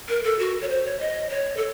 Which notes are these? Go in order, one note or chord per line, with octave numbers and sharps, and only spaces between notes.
A#4
A4
F#4
C#5
C5
C#5
D#5
C#5
A4